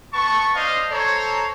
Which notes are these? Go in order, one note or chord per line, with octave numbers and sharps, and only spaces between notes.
B3 A5 C#6
D4 C5 D#5 F5
A4 C5 C#5 A#5